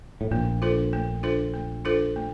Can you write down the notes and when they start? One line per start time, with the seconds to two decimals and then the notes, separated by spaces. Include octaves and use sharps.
0.21 A2
0.31 A#1 A#2 A3
0.62 D4 F4 A4 C5
0.93 A3
1.23 D4 F4 A4 C5
1.54 A3
1.85 D4 F4 A4 C5
2.16 A3